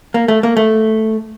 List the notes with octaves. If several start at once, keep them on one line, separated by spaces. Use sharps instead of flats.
A#3
A3
A#3
A3